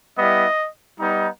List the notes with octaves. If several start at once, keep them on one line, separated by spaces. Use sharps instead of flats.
G3 B3 E4 D#5
G3 B3 D#4